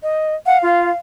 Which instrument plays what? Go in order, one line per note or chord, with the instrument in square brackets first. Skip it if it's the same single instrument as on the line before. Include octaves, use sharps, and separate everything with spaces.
[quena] D#5
[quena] F5 [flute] F#5
[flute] F4